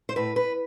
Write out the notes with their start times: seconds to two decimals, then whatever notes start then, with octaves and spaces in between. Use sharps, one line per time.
0.09 C5
0.16 A2 B4
0.36 B4